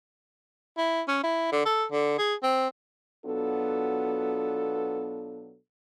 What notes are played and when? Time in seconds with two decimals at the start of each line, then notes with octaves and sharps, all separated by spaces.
0.77 E4
1.08 C#4
1.23 E4
1.52 D3
1.65 A4
1.91 D3
2.18 G#4
2.43 C4
3.26 B2 F#3 B3 D4 F4 A4